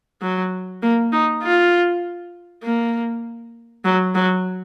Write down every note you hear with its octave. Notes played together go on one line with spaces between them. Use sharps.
F#3
A#3
D#4
F4
A#3
F#3
F#3